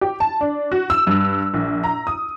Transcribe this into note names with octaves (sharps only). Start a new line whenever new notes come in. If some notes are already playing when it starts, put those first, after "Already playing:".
G4
A5
D4
F#4
E6
G2
A#1
A#5
D#6